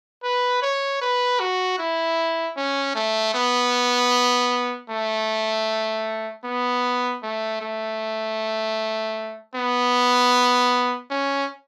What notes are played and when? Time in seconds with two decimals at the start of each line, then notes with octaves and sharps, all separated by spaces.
0.23 B4
0.62 C#5
1.01 B4
1.40 F#4
1.78 E4
2.56 C#4
2.95 A3
3.34 B3
4.90 A3
6.44 B3
7.23 A3
7.61 A3
9.55 B3
11.10 C#4